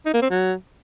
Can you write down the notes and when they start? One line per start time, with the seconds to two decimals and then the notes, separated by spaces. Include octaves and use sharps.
0.06 D#4
0.14 A#3
0.22 C4
0.31 F#3